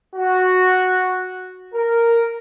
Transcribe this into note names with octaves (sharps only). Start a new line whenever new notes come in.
F#4
A#4